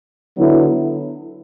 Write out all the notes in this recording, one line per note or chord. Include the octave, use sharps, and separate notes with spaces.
D3 F#3 B3 E4